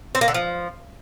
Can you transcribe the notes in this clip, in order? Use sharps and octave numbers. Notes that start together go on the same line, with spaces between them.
C4
A#3
D3
F3